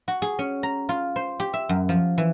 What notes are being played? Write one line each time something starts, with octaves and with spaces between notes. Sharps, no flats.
F#4
G#4
C#4
A#5
F4
C5
G4
E5
F#2
F3
E3